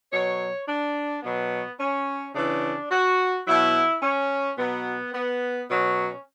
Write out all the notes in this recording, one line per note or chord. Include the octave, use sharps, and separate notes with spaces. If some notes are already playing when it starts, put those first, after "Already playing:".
B2 F#3 C#5
D4
B2 F#3 B3
C#4
C#3 E3 D4
F#4
B2 F#3 E4
C#4
B2 F#3 B3
B3
B2 F#3 C#4